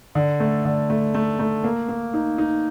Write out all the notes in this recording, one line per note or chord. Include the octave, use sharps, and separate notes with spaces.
D3
A3
D3
A3
A3
A3
A#3
A#3
D#4
D#4